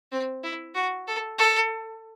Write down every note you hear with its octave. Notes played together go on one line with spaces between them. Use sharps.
C4
E4
F#4
A4
A4